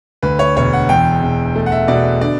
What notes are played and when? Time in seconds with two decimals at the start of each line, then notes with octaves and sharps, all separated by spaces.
0.23 D2 B4
0.39 C#5
0.57 E1 C#5
0.73 F#5
0.89 E2 G5
1.22 E1
1.56 A3
1.66 F#5
1.72 E5
1.88 B2 D5
2.21 D3 D5